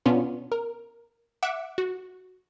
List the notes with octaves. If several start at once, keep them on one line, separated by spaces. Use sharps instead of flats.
B2 B3 C#4 D4 F4
A#4
E5 F#5 D6
F#4